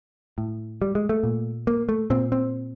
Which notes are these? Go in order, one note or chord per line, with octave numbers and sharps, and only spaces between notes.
A2
G3
G#3
A3
A#2
A#3
A3
A#2 C4
C4